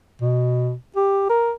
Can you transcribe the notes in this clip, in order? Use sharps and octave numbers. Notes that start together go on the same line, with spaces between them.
B2
G4
A#4